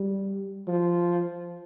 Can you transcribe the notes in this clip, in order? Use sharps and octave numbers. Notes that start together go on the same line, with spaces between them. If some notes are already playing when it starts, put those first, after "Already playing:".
Already playing: G3
F3